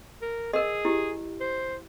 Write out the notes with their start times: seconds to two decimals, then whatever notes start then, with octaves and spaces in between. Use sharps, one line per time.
0.22 A#4
0.53 G#4 A#4 D#5
0.85 E4 G4
1.40 C5